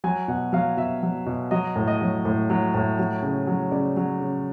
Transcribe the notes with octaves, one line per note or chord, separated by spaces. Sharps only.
F#3 G#5
B2 F#5
F#3 F5
B2 E5
F#3
B2
F#3 D#5
A2
D#5
F#3
A2
F#3
A2
F#3
C#3
F#3
C#3 D5
F#3
C#3